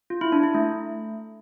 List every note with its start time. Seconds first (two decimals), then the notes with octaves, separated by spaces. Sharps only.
0.10 F4
0.21 E4
0.32 D4
0.43 E4
0.54 A3